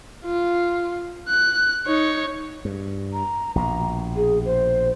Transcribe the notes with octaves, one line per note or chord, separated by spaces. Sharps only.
F4
F#6
D#4 C#5
G2
A#5
A#1 B2 A#5
G#4
C5